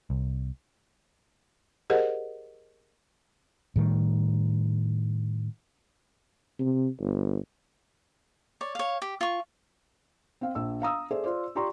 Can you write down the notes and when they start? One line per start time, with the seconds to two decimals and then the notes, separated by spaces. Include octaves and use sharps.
0.10 C2
1.90 G4 G#4 A#4 C5 D#5 F#5
3.76 A2 D#3 G3
6.59 C3
7.00 G1
8.61 C#5 D5
8.75 C#5 F5
9.02 G4
9.21 F4 C#6
10.41 C4 F5
10.55 A#1 E6
10.82 F5 A#5 D#6 E6
11.11 G#4 A4 C5 D5 E5
11.23 F4 C5 D5
11.55 F4 G4 D5 A#5 C6 C#6